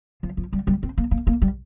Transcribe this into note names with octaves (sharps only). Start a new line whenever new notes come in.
F3
F3
G3
G3
C4
A#3
A#3
A#3
G3